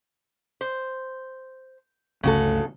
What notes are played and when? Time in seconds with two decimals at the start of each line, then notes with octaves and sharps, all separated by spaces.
0.61 C5
2.23 G1 C#2 C#3 A3 F#4 A4